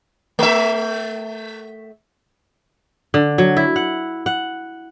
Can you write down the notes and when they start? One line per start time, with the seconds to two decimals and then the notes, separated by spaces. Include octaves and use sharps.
0.39 A3 E5
3.14 D3
3.38 F#3
3.57 E4
3.76 F#5
4.26 F#5